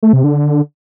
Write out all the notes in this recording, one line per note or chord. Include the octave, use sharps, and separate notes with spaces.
A3
C3
D3